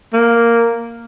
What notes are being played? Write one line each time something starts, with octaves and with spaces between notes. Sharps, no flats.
A#3